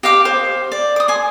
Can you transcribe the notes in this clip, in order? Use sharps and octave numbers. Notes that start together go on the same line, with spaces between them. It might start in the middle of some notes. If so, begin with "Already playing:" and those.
G4 D#5 F5 D6
C5
D5
D6 D#6
G#5 C6